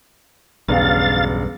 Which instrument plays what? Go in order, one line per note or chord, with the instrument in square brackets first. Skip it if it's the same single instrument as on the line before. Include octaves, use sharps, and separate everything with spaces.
[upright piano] E1 C#3 [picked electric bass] B1 G2 [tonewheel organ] F5 A6